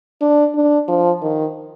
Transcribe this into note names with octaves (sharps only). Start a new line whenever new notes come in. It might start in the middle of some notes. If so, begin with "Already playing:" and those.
D4
D4
F3
D#3